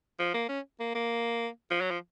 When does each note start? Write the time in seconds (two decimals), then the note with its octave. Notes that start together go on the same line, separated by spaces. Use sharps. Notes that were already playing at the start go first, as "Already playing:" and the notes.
0.19 F3
0.34 A#3
0.49 C#4
0.80 A#3
0.95 A#3
1.71 F3
1.81 F#3
1.91 F3